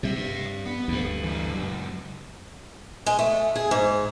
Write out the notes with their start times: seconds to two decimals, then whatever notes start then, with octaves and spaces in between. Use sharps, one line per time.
0.03 C3 G3 C#5 E5
0.16 G2
0.66 B3
0.88 D2 G2
1.23 E3 G4
1.49 C#2 F#2
3.06 G#3
3.19 A3
3.55 G#4
3.71 G#2